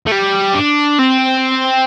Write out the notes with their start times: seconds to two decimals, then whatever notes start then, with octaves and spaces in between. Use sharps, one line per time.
0.07 A3
0.12 G3
0.54 D4
0.99 C4